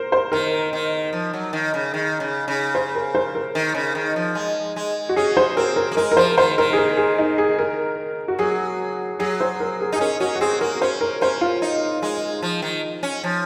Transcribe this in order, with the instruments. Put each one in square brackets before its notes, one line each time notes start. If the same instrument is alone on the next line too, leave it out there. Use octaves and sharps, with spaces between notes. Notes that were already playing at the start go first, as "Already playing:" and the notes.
Already playing: [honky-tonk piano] A#4 C5
C5
[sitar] D#3 [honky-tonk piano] A#4
[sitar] D#3
F3
F#3
D#3
C#3
D#3
C#3
C#3
[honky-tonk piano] C5
A#4
C5
A#4
[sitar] D#3
C#3
D#3
F3
G#3
G#3
[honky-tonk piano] F#4
[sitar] C#4 [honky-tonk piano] G#4
[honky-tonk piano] C5
[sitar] C4 [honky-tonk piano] A#4
[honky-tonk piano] A#4
[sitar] A#3
[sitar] G#3 [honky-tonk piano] A#4
[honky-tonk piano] A#4
[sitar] F3 [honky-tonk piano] C5
[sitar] D#3 [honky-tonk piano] C5
[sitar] D#3 [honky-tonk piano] A#4
[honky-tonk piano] G#4
A#4
G#4
D#4
G#4
A#4
F#4
[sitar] F#3 [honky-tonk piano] G#4
[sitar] F#3 [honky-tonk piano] G#4
[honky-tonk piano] C5
A#4
G#4
[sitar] D#4
[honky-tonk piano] G#4
[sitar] C#4 [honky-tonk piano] A#4
[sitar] C#4 [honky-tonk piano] F#4
[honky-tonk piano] F#4
[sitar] C4 [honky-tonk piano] G#4
[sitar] A#3 [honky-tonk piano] A#4
[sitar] C#4 [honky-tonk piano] C5
[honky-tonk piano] A#4
[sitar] C#4 [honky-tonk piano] C5
[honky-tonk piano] F4
[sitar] D#4
G#3
F3
D#3
C#4
F3